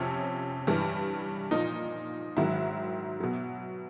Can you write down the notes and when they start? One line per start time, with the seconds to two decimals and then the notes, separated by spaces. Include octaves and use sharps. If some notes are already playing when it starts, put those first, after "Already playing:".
Already playing: F2 C3 F3 C#4
0.67 G2 E3 G3
1.51 A#2 F3 D#4
2.36 G#2 D#3 F#3 E4
3.20 B2 F#3